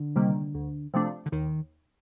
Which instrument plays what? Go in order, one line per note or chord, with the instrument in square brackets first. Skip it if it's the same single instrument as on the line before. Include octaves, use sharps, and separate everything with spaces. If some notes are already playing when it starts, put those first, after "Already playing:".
Already playing: [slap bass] D3
[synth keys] C3 D#3 G3 A#3
D2
C3 F3 A3 D4
[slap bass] D3
[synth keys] D#2 [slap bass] D#3